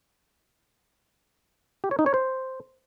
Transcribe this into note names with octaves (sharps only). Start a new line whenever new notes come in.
G4
C#5
D#4
C#5
C5